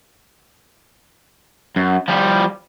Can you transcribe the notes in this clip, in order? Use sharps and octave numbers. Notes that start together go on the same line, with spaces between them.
F#2
F3 G3